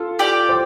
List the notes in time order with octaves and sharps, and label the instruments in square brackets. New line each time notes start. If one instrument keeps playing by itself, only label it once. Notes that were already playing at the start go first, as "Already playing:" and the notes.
Already playing: [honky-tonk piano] F4 A4
[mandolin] G4 D5
[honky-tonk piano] C5